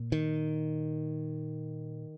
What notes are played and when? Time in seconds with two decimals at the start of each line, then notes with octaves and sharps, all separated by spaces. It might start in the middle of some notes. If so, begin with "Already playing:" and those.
Already playing: A#2
0.12 D#3